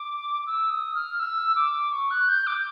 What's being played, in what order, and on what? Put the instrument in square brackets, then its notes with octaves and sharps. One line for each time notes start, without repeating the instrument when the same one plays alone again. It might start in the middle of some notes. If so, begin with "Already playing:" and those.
Already playing: [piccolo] D6
E6
D#6
F6
E6
D6
C#6
F#6
G6
D6